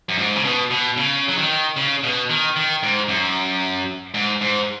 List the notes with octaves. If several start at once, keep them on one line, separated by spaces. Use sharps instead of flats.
F#2
G#2
C#3
B2
B2
C#3
F#3
D#3
C#3
B2
D#3
D#3
G#2
F#2
G#2
G#2